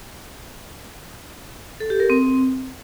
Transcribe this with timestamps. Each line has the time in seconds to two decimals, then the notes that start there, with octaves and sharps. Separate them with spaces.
1.80 A4
1.90 G4
2.00 A#4
2.10 C4